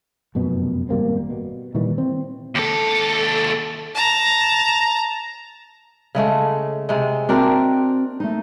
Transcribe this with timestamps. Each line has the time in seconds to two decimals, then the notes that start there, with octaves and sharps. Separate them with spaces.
0.35 F1 F#2 B2 B3
0.89 G#1 G3 A#3 C4
1.30 B2
1.74 A#2 D#3 E3 G3
1.98 C4
2.55 D#2 A4
3.95 A5 A#5
6.15 C#3 G#3 A3
6.89 C3 G#3
7.29 C4 D4 F#4 A#4 G5
8.20 A3 D#4